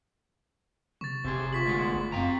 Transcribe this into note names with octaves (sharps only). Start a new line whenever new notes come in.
C3 C#6 A6
F1 C3 C4 G4 G#4
F4 C#6 B6 F#7
D2 G#3 B3
F#1
F#2 C4 F5 G5 A#5